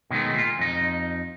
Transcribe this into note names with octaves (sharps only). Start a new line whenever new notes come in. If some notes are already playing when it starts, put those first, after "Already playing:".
B2 D#3 F3 G#3 A3
A#2 F4
F2 D#4